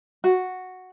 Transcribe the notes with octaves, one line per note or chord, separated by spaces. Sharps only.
F#4